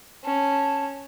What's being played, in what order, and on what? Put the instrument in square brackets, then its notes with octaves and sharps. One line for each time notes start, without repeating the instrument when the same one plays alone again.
[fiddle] C#4 [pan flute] A5